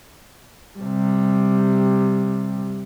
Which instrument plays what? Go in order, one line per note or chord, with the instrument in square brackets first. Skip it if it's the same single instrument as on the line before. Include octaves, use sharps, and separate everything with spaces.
[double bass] C3 G3